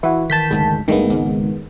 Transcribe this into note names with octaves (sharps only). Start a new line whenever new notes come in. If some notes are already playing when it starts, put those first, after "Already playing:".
E3 E4 F#4
D#3 A5 G6 B6
D2 G#2 C#3
G#1 G2 D#3 G#3 A3 B3
C#2 G#2